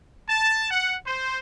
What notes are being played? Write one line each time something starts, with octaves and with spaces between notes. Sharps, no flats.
A5
F#5
C5